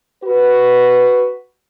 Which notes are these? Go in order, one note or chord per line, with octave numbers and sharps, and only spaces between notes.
F#4 B4